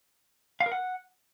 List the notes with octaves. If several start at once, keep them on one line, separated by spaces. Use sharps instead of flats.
F5
A#4
F#5